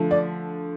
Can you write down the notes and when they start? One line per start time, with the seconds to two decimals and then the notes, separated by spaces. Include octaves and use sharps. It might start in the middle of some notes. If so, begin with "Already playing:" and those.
Already playing: D3 F3 A3
0.11 D5